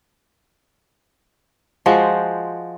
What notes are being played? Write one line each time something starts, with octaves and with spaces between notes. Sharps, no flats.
F3 G#3 F#4 C5